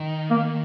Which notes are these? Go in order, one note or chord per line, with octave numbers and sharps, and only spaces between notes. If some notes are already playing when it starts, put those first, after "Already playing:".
Already playing: D#3
A#3